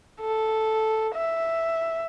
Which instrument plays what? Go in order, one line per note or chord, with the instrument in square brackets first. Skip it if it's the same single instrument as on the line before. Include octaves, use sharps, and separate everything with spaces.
[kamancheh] A4
E5